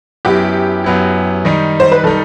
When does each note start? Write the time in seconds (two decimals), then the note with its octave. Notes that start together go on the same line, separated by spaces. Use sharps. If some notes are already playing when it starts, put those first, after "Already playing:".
0.25 F#2 F#3 B3 E4 G4
0.84 F#2 F#3 B3 E4
1.45 D#3 G3 D#4
1.80 C5
1.92 B4
2.03 D#3 G3 D#4 A4